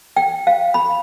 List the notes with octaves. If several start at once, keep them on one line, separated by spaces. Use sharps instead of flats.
G5
F5
B5